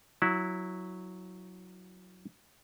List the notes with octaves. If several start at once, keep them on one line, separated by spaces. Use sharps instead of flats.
F#3 E4 F#5